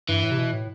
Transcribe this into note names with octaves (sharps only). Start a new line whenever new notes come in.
G2 E3
A2
C3
B2
A2